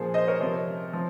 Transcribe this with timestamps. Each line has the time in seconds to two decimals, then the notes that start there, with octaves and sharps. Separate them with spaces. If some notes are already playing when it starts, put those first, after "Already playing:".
Already playing: A#2 F3 G#4 C5
0.14 C5 D#5
0.27 A#4 C#5
0.40 C3 F3
0.93 F3